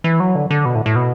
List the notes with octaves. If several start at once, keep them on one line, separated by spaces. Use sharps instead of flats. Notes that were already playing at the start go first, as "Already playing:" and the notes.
E3
F#3
D3
D3
B2
A2
A2
B2